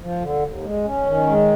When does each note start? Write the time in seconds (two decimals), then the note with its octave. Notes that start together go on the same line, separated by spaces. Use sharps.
0.01 F3
0.21 D3
0.43 D#2
0.64 G#3
0.84 C#4
1.06 D#3
1.27 G#3